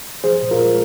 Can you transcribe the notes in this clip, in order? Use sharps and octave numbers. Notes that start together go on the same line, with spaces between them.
F3 G#4 C5
A#2
F4 A#4
G#3